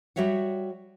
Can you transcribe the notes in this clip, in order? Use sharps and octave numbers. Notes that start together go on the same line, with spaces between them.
G3 F#4 C#5 E5 F#5